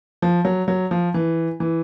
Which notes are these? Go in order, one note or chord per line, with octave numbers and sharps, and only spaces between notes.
F3
F#3
F#3
F3
E3
E3